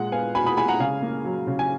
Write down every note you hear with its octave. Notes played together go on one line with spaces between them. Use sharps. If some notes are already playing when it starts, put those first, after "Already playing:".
Already playing: A#2 G#3 F#5
B3 F5 G#5
B2 G#5 B5
B5 D#6
G#3 G#5 B5
F#5 A#5
C#3 F5 G#5
A#3
F#3
C#3
G#5